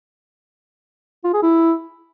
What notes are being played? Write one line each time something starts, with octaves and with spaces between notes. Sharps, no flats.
F4
G#4
E4